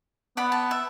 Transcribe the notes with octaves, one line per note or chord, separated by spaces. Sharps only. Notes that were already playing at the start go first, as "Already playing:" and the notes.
B3 D5 F#5 B5
A5
E5